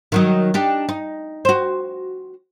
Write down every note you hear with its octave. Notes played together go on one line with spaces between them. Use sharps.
D#3 F#3 D#4
D4 D#4 G4
D#4
F#4 C5